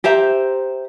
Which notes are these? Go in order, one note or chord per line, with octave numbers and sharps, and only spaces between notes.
G4 C5 E5 A#5